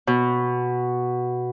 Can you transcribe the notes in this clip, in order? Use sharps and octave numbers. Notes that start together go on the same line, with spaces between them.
B2